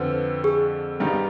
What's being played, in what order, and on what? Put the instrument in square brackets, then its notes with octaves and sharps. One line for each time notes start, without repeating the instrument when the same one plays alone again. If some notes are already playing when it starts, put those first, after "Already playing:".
Already playing: [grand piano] F2 D3 F3 [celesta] B4
[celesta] G#4
[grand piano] G2 D#3 G3 B3 D#4